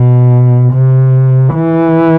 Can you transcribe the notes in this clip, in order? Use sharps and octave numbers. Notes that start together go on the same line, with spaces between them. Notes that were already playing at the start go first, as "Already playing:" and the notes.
Already playing: B2
C3
E3